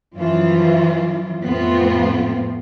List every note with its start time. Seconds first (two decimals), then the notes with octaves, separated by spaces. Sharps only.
0.17 F#2 E3 F3 F4
1.44 F2 A2 A3 B3 C4 F4